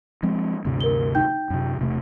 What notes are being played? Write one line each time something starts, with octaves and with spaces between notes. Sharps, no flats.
F3 G#3 C4
D2 G2 C3
A#4 G7
D#4 G5 G6
F#2 C3
E1 C3 A3